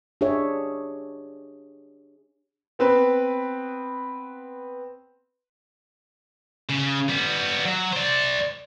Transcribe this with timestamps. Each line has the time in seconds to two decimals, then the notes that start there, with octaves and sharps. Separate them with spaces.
0.21 D4 G4 G#4 C#5 E5
2.79 B3 C4 B4
6.70 C#3
7.09 G3 B3
7.65 F#3
7.93 C5 D5